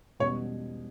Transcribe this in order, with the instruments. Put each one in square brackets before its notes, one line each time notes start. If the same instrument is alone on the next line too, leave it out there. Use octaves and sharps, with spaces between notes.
[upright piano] E1 E2 B2 G3 C#4 [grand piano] C#5